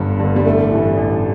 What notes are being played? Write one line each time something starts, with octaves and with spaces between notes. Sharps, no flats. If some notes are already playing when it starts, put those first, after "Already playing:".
Already playing: G1 G2 D3 G3
G2 D3
G3
A1 A3
G2 E3
A1